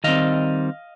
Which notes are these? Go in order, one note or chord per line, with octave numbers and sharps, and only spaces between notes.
D#3 G3 C4 D#5 F5